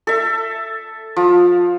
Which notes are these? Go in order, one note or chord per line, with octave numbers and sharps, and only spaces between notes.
A4 E5
F3